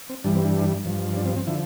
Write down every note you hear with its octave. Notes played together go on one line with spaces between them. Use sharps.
C4
G2 E3 G3 D4
C4
D4
G2 F3
D4
C4
C4
D3 F3 E4